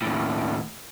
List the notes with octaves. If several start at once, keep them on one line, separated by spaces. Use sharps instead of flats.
D#2 A2